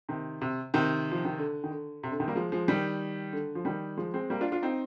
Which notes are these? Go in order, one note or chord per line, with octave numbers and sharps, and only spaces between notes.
C3 D#3
C3
C3 D#3
F3
D#3
D3
D#3
D3
C3
D3
C3 D#3
G3 A#3
F3 G#3
F3 G#3
D#3 G3
D3
F3
D#3 G3
F3 G#3
G#3 C4
G3 A#3
D4 F4
D4 F4
C4 D#4